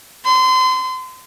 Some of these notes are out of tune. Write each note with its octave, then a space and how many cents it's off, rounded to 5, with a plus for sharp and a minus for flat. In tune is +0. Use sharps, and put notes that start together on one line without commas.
C6 -30